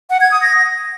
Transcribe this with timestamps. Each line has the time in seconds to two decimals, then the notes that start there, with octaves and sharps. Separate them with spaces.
0.10 F#5
0.21 G#6
0.31 D#6
0.42 A#6